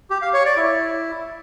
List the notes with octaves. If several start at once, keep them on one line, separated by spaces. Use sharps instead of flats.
G4
F5
C#5
D5
E4